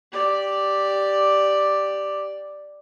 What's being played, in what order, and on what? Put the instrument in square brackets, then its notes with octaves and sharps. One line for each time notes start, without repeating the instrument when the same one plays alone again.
[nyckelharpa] G4 D5